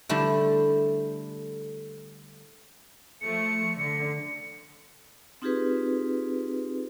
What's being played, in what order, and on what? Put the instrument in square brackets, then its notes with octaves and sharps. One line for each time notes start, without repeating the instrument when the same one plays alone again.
[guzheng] D3 G3 A3 E4
[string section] F3 A3 [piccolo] C#7
[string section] D3 [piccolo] C#7
[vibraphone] C4 D#4 F4 G4 G#4 B4